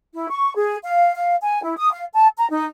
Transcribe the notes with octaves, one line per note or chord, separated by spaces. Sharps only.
E4
C#6
G#4
F5
F5
G#5
E4
D#6
F5
A5
A#5
D#4